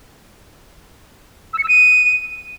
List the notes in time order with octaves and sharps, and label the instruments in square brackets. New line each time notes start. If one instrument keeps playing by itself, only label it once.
[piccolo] E6
C#7
E6
D#7